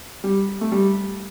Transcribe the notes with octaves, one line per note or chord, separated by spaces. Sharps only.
G3
A3
G3